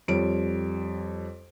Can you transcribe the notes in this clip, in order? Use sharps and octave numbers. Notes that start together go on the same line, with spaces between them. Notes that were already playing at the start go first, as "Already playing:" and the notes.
F2 G3 C#5 D7